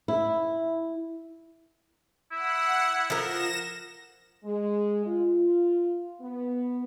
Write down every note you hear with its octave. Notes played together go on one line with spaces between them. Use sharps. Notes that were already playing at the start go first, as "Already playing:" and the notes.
E4
E4 F#5
F3 A#4 A#6 E7
G#3
F4
B3